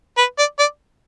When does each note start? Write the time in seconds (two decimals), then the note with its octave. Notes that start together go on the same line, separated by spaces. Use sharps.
0.18 B4
0.38 D5
0.59 D5